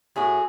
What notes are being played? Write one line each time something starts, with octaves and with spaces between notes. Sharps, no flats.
A2 F#4 G#4